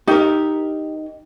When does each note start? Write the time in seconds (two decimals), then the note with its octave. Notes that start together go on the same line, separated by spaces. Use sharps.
0.08 D#4 G4 A#4